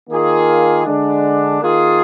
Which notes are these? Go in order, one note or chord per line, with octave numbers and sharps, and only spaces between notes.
D#3 A#3 F4 G#4
D3 G#3 D4
D#3 A#3 F4 G#4